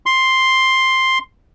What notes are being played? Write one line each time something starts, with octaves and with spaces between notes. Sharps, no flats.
C6